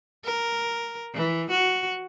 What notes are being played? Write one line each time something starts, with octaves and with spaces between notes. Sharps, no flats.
A#4
E3
F#4